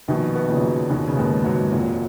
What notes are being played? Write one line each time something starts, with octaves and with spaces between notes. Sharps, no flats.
A#1 B2 D#3
B3
A#2 C#3
F#3
D#2 B2 D#3
C#3
D#2 G#2 B2
G#2 F#3
F1 A#2